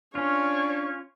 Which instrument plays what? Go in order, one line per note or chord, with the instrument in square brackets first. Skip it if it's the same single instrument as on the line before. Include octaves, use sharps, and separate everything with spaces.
[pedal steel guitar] C#4 F4 [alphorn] D4 [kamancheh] C#5